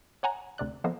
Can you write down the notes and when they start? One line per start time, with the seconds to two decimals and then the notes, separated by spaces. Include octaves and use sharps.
0.23 C#5 F#5 G#5 A#5
0.58 D2 C3 D5 F#6
0.84 F3 A#3 B3 A4 C5 D#5